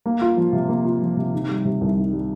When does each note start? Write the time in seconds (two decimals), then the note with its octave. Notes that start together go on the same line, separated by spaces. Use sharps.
0.06 A#3
0.21 F4
0.37 F3
0.53 C3
0.69 A#3
0.85 F4
1.02 F3
1.17 C3
1.34 D#3
1.49 G3
1.65 C3
1.81 C2
1.97 D#3
2.13 G3